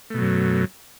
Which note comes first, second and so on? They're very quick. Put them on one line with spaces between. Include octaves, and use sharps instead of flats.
A3 B2 F#3 F#2